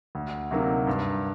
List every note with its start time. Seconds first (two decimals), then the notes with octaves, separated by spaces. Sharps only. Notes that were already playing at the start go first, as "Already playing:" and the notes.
0.15 D2
0.51 C3 F#3 A#3 D#4
0.87 G2